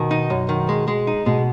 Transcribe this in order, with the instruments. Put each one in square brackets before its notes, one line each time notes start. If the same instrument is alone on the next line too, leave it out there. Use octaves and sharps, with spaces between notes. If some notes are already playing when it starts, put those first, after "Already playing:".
Already playing: [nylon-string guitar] B2 [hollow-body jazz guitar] D#3
[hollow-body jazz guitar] D#4
F#2
D#3
G#3
G#3
D#4
[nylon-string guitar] B2 [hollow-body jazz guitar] G#3